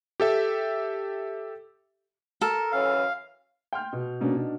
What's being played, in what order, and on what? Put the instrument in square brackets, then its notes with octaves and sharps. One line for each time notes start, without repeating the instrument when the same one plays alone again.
[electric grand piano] G4 A4 E5
[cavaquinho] A4 [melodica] A#4
[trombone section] F#2 E3 C#4 [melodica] F5
[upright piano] G5 C6 F6 G6
B2
B2 A#3 C#4 D4
B2 D4 D#4